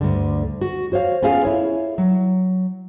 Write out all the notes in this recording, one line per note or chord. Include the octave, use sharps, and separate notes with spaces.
D2 G2 D3
F#4
F#4 C5 C#5 F5
B3 C#4 F4 G#4 A4 F5
E4 C#5
F#3